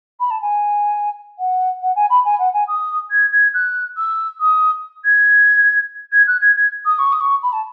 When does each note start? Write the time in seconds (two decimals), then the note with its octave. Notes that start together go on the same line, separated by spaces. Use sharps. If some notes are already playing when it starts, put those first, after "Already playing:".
0.20 B5
0.30 A5
0.41 G#5
1.38 F#5
1.82 F#5
1.95 G#5
2.09 B5
2.25 G#5
2.38 F#5
2.53 G#5
2.67 D#6
3.11 G#6
3.32 G#6
3.54 F#6
3.97 E6
4.40 D#6
5.04 G#6
6.12 G#6
6.27 F#6
6.41 G#6
6.56 G#6
6.85 D#6
6.98 C#6
7.12 D#6
7.20 C#6
7.42 B5
7.52 A5